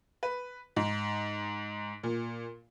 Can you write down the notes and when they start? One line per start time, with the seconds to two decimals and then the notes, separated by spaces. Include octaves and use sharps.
0.23 B4
0.76 G#2
2.03 A#2